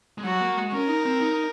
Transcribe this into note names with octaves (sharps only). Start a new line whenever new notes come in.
G#3
F#3 F#4
A#3
G#3
C#4 A#4
D#4
C4
D#4